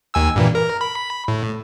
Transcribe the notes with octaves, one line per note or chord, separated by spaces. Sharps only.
D#2 G#5 E6
G2 A#2 E3
A#4
B5
A2